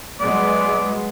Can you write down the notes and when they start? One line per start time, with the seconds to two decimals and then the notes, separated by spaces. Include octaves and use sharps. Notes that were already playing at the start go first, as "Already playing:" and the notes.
0.20 F#3 G#3 B3 D5